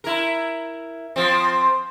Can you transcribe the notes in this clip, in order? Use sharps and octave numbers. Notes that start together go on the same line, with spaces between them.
E4 A#4
F3 C4